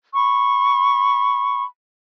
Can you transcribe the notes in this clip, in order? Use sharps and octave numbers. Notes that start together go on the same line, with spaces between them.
B5 C#6